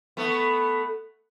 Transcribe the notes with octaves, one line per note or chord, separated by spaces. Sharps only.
A3 B3